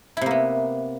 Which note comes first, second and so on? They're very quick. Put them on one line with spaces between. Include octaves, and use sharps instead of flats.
E4 C3 A#3 B3